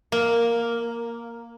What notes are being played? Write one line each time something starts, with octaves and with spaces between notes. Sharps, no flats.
A#3